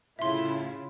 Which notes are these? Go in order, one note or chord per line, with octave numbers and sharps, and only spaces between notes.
A2 C#3 E4 F4 E5 C6